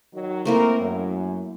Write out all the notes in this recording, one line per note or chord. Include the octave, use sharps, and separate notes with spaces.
D#3 F#3 F#4
A3 A#3 C4 E4 A#4
F#2